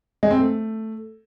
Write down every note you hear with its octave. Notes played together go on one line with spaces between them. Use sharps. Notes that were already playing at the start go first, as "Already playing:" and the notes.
G#3
C4
A3